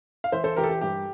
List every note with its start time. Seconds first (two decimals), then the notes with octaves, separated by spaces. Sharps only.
0.24 F5
0.32 E3 C5 E5
0.44 A4 C5
0.56 E3 G4 A#4
0.64 A4
0.69 G4
0.81 G2 G4